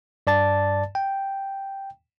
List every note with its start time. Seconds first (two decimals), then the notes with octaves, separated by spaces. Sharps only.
0.27 G2 D5 A5 A6
0.95 G5